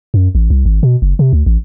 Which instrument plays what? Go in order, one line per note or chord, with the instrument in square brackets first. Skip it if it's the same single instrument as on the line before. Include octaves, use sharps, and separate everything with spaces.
[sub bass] F#2
A1
C2
G#1
B2
F#1
C3
D2
A1